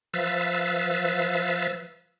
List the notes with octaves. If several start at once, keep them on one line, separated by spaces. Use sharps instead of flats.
F3 B4 E5 F5 E6 A6